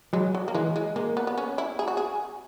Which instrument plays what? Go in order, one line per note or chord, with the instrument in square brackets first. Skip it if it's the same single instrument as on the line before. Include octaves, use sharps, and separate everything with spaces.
[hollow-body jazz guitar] F#3 [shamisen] G#3
[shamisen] F#3
A#3
[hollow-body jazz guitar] E3 [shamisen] G#3
[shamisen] G#3
[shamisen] G#3 [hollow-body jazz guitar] A#3
[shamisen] B3
B3
C#4
E4
G#4
F#4
G#4